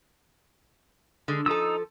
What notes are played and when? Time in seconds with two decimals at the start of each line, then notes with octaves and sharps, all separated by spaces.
1.28 D3 G#3
1.46 F3 D#4 A4 D#6 E6